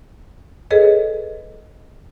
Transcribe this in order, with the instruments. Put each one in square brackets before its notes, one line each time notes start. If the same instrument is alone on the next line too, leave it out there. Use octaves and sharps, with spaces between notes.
[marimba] G#4 A4 B4 C#5 D#5